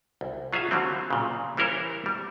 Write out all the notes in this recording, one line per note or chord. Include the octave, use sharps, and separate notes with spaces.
C2
F#3 F4 G#4 E5 F5
D3 F#3 G3 C4
A#2 C#3
E3 G3 E4 A#4 C5 C#5
G3